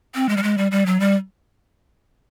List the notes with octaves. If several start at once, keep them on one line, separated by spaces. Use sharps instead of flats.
C4
G#3
G3
G#3
G3
G3
F#3
G3